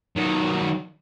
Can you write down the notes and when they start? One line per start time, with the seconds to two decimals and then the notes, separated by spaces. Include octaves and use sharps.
0.16 D#3 F#3